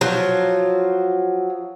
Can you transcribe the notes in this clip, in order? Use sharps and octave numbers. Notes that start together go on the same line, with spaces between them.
F3 F#3